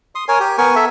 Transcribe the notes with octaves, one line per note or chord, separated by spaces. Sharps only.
C6 D#6
A#4 C#5 G#5
G4
B3 A#4 G#5 C#6
A4 E5